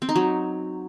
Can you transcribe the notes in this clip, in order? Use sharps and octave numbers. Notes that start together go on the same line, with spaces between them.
C4
D#4
F#3